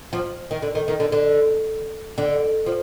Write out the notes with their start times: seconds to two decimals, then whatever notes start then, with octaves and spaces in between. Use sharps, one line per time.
0.13 F3
0.51 D#3
0.62 D3
0.75 D#3
0.88 D#3
1.00 D3
1.12 D3
2.18 D3
2.66 F3